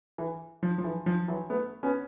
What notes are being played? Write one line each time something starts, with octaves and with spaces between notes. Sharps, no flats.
E3
F3
F3
E3
F3
E3 F#3
A3 B3
B3 C#4